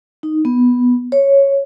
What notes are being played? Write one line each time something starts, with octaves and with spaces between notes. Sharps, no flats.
D#4
B3
C#5